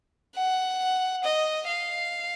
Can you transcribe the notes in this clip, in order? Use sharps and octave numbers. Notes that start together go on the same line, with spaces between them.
F#5
D#5
F5